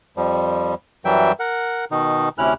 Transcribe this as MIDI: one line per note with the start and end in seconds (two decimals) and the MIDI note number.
0.17 0.74 41
0.17 0.74 53
0.17 0.74 55
1.05 1.32 42
1.05 1.32 52
1.05 1.32 54
1.05 1.32 55
1.05 1.32 76
1.05 1.32 79
1.40 1.85 70
1.40 1.85 78
1.91 2.29 47
1.91 2.29 51
1.91 2.29 63
2.38 2.54 38
2.38 2.54 48
2.38 2.54 61
2.38 2.54 64
2.38 2.54 89
2.38 2.54 90